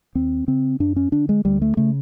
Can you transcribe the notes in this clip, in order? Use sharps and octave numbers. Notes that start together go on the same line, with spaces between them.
D#2 C4
C#3 C4
F#2 D4
C#4
D3 D4
G#3
D2 G3
A3
C#3 A3